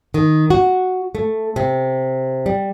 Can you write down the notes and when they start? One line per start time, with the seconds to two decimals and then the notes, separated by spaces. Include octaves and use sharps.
0.14 D#3
0.50 F#4
1.15 A3
1.56 C3
2.46 G3